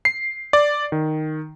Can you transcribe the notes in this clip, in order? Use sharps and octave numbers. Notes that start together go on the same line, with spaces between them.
C7
D5
D#3